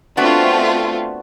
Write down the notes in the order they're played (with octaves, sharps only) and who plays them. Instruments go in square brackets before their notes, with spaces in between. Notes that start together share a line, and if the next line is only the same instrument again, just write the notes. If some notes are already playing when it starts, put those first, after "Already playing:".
[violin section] A3 C4 F4 [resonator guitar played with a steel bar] B3 D4 F#4